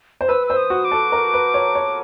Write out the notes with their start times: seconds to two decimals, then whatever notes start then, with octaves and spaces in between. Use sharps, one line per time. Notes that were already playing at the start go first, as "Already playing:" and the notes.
0.21 C5
0.28 B4 E6
0.47 C5 E6
0.57 D#6
0.70 F#4
0.85 D6
0.91 A4
1.12 A#4
1.34 B4
1.54 C#5
1.75 C#5